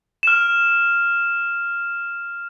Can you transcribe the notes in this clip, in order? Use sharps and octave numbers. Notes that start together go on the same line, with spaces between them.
F6 E7